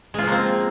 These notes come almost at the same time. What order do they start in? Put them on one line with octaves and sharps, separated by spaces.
G#3 F4 F3 A#3 C4